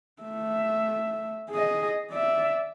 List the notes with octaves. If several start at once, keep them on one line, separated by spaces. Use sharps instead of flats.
A3 E5
G#4 D#5
D5 E5